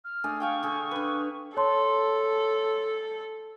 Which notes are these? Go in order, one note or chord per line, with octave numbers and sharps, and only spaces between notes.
F6
A3 D4 G#4
G#4 F5 G5 C#6
D3 G#4
D3 B4
A4 C#5 A5 C6